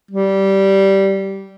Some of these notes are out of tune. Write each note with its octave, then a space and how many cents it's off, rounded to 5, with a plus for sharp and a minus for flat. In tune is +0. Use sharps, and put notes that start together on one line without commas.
G3 -15